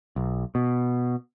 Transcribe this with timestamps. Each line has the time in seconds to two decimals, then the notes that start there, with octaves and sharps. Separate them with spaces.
0.16 B1
0.55 B2